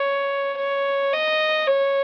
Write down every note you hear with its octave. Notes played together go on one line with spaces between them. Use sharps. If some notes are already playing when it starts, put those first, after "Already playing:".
Already playing: C#5
C#5
D#5
C#5